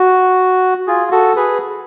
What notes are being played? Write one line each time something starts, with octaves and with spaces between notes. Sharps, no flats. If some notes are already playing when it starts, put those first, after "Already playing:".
Already playing: F#4
F4 G#4
F#4 A4
G#4 B4